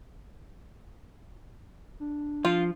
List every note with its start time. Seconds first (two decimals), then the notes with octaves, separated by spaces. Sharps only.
2.00 D4
2.45 F3 F4